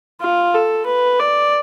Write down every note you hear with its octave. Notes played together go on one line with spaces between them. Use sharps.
F4
A4
B4
D5